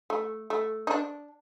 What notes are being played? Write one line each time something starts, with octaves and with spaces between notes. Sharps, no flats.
A3
A3
D#4
D4